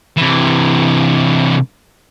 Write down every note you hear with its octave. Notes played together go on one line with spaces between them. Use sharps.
C3 E3